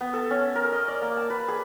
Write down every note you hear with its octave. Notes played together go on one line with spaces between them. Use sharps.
B3
A4
C#4
A#4
D#5
D5
A#3
A5
B4
G#4